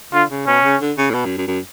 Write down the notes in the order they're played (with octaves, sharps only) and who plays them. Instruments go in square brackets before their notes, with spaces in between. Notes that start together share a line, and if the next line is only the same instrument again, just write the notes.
[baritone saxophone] D3 [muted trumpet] F4
[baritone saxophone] C#3
[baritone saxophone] B2 [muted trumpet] C#4
[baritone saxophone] C#3
D3
C#3
A2
B2
F#2
F#2
F#2